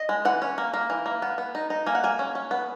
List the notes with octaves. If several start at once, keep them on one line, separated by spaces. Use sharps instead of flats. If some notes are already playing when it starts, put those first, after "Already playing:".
Already playing: D#5
G#3
E3 F#5
C#4
A#3
A#3
E3
A#3
B3
B3
D#4
D#4
A#3 G#5
F#5
A#3 G#5
C#4
C#4
B3